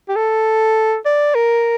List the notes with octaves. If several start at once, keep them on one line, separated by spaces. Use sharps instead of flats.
G4
A4
D5
A#4